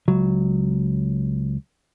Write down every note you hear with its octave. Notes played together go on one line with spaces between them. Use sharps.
C#2 F#3